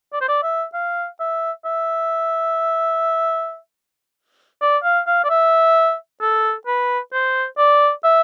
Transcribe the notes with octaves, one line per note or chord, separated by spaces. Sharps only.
D5
C5
D5
E5
F5
E5
E5
D5
F5
F5
D5
E5
A4
B4
C5
D5
E5